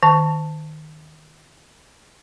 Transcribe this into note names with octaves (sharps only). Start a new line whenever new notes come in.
D#3 A5